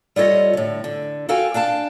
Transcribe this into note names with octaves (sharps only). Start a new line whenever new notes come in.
G3 F4 A4 C#5 D#5
A2 D3
D3
F#4 A4 F5 G5 G#5
D4 F5 G5 A5